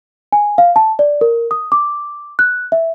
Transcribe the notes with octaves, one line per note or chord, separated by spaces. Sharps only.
G#5
F5
A5
D5
A#4
D#6
D6
F#6
E5